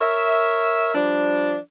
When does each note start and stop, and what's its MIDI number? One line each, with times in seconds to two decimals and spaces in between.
0.01 0.92 70
0.01 0.92 73
0.01 0.92 76
0.95 1.56 53
0.95 1.56 55
0.95 1.56 62